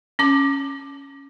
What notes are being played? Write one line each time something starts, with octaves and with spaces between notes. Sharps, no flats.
C#4 A5 D6